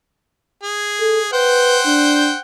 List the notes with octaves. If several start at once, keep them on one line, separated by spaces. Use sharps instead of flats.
G#4
A4
B4 C5 F#5 G5
D4